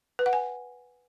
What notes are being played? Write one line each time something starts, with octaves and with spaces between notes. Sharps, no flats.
B4
F#5
G#5